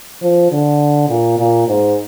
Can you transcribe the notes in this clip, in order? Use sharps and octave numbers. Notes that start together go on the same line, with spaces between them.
F3
D3
A#2
A#2
G#2